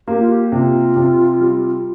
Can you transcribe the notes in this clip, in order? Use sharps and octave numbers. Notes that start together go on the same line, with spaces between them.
A#3 G4
F4
G4
C3 F4
C3
G3